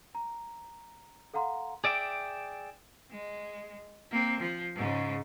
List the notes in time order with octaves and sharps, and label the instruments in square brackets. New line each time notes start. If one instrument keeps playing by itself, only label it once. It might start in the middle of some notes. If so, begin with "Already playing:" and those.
[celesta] A#5
A4 F5 F#5 A#5 C6
[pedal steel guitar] G#4 D5 E5 G5 D6
[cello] G#3
A#3 C4
F3
G#2 C#3